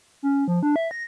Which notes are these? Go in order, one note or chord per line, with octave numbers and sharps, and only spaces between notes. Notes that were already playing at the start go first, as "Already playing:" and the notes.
C#4
F3
D4
E5
A#6